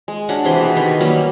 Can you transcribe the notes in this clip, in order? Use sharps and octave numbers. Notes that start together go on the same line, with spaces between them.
G#3
C#4 D4 F#4 F#5
C3 E3 G#4 C6
B2
D#3 G4 B4 C#6
F#3 G3 A#3 C#4